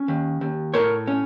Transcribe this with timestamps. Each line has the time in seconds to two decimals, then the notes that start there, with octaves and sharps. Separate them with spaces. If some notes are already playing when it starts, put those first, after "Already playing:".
Already playing: C#4
0.08 D#2
0.41 D#2
0.74 A2 A#4 C#5
1.07 C#4